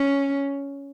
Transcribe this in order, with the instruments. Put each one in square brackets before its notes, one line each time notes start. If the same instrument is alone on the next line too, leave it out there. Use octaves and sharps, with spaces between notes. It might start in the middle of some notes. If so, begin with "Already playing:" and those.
Already playing: [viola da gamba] C#4